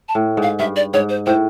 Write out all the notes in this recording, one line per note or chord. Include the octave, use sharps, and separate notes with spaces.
A5
A2
G#2
F5
G2 E5
D5
G#2 C#5
C5
A2 C5